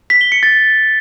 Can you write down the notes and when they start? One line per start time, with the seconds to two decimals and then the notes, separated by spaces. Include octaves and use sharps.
0.10 B6
0.21 G7
0.32 C#7
0.43 A6